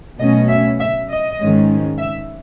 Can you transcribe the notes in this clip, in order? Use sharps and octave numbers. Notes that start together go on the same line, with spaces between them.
B2 F#3 A3 C#4 D#5
E5
E5
D#5
G#2 D#3 G#3 C#4
E5